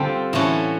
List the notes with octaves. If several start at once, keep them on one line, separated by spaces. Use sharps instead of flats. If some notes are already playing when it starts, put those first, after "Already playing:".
Already playing: D3 G3 C4 F4 A4
A2 E3 A3 C#4 F#4